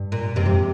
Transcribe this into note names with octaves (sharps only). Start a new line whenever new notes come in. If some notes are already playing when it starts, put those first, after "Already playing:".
Already playing: G2
A#2
G2 C3
F2